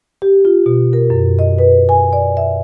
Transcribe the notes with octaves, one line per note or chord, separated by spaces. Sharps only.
G4
F4
B2
A#4
F#2
D#5
B4
G#5
D5
E5